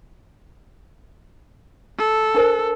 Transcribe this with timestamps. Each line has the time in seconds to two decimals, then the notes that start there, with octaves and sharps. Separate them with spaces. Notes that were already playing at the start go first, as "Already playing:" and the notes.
1.98 A4
2.35 D4 A#4 C5